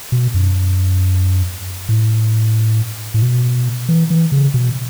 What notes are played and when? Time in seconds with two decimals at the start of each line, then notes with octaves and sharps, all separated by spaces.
0.12 B2
0.34 F#2
1.89 A2
3.14 A2
3.22 B2
3.89 E3
4.10 E3
4.32 C#3
4.54 B2